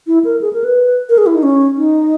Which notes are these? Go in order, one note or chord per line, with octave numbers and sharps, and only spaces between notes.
E4
A#4
G#4
A#4
B4
A#4
G#4
E4
D#4
C#4
D#4